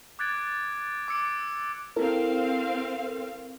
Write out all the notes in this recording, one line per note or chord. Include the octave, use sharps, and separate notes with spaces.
D6 F#6 G#6 A6 D7
D6 E6 C#7 D7
C4 E4 A4 A#4 F5